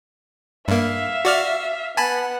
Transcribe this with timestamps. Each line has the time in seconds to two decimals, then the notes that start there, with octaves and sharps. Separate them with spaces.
0.68 G2 A#3 E5 F5
1.25 F#4 D5 F6
1.97 B3 F#5 G#5 A5 B5